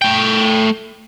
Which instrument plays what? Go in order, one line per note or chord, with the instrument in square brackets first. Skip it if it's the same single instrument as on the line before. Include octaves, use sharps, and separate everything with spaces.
[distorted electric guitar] A3 G5